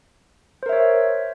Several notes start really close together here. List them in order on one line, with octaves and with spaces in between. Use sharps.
C5 A#4 E5 C#5